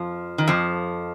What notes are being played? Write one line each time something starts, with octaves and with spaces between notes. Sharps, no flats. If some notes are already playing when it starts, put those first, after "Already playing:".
Already playing: F2 F3
D#3
F2 F3